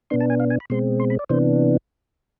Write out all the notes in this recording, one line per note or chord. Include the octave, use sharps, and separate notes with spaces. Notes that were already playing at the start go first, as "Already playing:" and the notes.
B2 B3 D4 C6
A5
G#5
F5
G#5
B5
B2 G#3 C4 C6
C6
B5
D5
C3 E3 B3 D4 C5